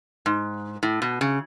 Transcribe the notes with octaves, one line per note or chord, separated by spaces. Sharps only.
G#2
A2
B2
C#3